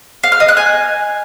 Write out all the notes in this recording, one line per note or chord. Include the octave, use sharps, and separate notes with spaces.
F5
F6
D#5
F#6
G#5